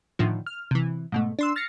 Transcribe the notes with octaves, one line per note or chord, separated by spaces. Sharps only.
A2 D3 D#3 F3
F6
C3 E3
G#2 B2 A3
D4 C6 E6
F6 A6 A#6 C7 C#7